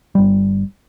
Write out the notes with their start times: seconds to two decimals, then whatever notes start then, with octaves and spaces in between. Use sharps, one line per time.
0.15 G1 G3